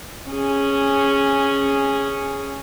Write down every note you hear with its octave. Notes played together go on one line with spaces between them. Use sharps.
C#4 G#4